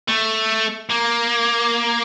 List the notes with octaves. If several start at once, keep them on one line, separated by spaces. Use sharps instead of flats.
A3
A#3